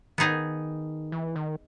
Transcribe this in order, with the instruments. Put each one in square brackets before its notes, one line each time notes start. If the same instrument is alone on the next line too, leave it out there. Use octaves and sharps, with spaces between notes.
[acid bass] D#3 [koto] B3 D#4 G#4
[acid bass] E3
D#3